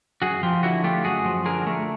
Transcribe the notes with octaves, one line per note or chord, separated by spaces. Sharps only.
F#2 F#4 G#4
F3 F4 G4
D3 E4 F#4
A3 F4 G4
F#2 F#4 G#4
F3
D3 G#4 A#4
A3